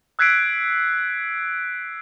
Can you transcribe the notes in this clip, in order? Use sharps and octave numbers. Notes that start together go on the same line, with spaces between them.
E6 F#6 G#6 B6 C7 D7